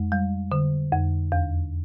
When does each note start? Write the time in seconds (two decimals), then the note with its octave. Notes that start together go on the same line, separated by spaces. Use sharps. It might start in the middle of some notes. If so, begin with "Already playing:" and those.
Already playing: F2 G#3
0.12 G3
0.52 D3
0.93 F2
1.32 E2